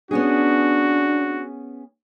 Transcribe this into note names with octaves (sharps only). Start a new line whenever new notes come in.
B3 C#4 D4 F#4 G#4